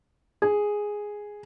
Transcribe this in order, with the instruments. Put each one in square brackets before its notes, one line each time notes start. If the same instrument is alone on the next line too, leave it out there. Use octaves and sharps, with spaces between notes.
[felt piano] G#4